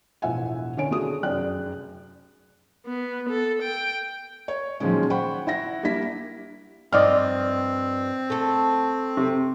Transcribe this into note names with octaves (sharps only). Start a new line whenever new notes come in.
E1 A2 F3 E5 F#5 G#5
D3 C#4 C#5 G#5 D7
D3 A3 F#4 G#4 D#6
F1 F#2 G#4 D5 G5 F#6
B3
A4
G5
C#5
A#2 D#3 F3 F#3 G#3 C#4
C5 F#5 G5 B5 C#6
E4 F#5 A#6
G3 A#3 D4 E4 B6
G2 F3 C4 D5 D#5 F6
A3 A4
C3